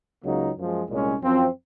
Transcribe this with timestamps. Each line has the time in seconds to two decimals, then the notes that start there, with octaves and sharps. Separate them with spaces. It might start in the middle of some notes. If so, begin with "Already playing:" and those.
0.24 C#2 C#3 F#3 A#3 D#4
0.57 F#2 F3 G#3
0.89 C2 A#2 G#3 C#4
1.22 F#2 F3 C4 F4